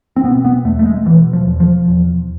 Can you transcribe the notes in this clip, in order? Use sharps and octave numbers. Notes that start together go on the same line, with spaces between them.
C4
B2 B3
B3
E2 A3
A3
G#3
B2 E3
F3
E2
F3
E2